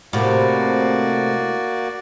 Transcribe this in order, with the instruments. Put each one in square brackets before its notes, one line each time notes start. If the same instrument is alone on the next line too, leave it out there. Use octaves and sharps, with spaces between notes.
[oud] A2 C3 [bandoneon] A#3 F#4 D5